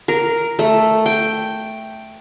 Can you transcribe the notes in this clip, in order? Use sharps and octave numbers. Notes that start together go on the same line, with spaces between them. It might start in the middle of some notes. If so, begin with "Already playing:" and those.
A#4
A3
G5